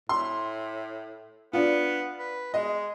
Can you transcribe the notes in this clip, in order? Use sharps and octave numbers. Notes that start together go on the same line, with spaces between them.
A2 C6
B3 D4 F4
B4
G#3 D#5